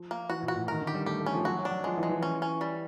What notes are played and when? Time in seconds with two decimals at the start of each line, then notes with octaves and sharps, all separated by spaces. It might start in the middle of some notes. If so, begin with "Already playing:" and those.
Already playing: F3
0.11 A#3
0.29 E3 F#4
0.43 A#2
0.48 F#4
0.55 A2
0.68 D#3 A#4
0.81 D3
0.87 G4
0.94 G3
1.06 A3 G4
1.20 A3
1.26 C#4
1.33 F3
1.45 F#3 F#4
1.58 F#3
1.65 D4
1.71 F#3
1.84 F3 G#3
1.97 E3
2.03 G#3
2.09 E3
2.23 C#4
2.42 C#4
2.61 G3